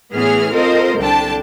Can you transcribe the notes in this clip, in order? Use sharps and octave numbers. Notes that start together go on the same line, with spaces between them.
A2 E3 B3 C#4 G#4 F6
C4 F4 A4 A#4 C5 D#5
C2 D3 D4 G5 A5